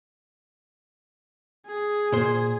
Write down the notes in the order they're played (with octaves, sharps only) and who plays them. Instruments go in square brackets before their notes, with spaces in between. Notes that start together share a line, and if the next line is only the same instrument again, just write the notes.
[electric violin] G#4
[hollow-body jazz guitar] A#2 C5